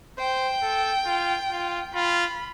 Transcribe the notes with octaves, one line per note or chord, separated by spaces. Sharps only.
C5 G5
A4
F4
F4
F4 B5